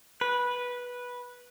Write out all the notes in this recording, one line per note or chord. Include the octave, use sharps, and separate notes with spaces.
B4